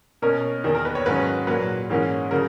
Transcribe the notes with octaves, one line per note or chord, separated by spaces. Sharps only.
B2 A#3 C#4 A#4
E2 D#3 A#3
A#4
B4
C#5
G#2 D#3 F#3 C#4 B4
A#2 F#3 A#3 B4
G#2 E3 A#3 C#4
C#3 F#3 A#4